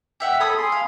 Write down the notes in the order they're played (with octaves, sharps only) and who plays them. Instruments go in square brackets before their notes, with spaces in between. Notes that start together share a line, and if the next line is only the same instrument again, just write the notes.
[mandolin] G4 E5 F#5
[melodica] A4 B5 [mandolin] C#5 D#6
[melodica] G#4 B5 C6
[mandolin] F5